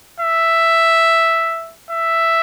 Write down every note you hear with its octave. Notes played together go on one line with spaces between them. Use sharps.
E5
E5